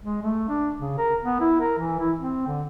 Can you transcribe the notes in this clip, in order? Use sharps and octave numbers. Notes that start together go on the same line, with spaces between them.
G#3
A3
D4
C#3
A#4
B3
E4
A#4
E3
E4
C4
D3